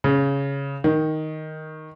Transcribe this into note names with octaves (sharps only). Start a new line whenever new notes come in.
C#3
D#3